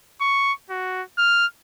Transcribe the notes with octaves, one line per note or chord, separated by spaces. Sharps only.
C#6
F#4
F6